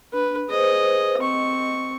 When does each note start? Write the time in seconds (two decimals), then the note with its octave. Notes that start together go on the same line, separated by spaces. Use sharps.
0.14 D4 B4
0.50 G#4 B4 C5 D#5
1.21 C4 D#5 C#6